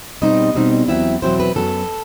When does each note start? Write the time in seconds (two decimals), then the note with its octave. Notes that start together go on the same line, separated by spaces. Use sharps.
0.22 B2 G3 C4 D#4 D#5
0.55 B2 G3 C4 D#4
0.88 E2 B2 F#3 C4 E4 E5
1.22 E2 B2 F#3 C4 E4 C5
1.40 B4
1.55 F#2 F#3 B3 A4